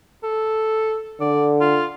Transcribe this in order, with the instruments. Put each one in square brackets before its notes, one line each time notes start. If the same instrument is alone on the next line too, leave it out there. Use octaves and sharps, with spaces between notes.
[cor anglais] A4
[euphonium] D3 [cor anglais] D5
[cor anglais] F4